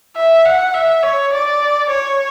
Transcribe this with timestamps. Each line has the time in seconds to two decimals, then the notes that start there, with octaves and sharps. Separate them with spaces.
0.17 E5
0.46 F#5
0.74 E5
1.03 C#5
1.33 D5
1.91 C#5